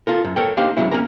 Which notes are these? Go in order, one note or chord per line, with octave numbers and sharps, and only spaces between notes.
F4 A4 A#4
F#2
A4 A#4 C#5 G5
A#3 D4 D#4 G4 C5 F5
C#2 F#2 C#3 F#3 E4
F2 A#3 C#4 A#4 A#5